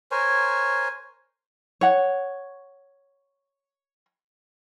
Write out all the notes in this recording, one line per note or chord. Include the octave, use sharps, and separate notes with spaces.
A#4 C5 C#5 G#5
C#5 F#5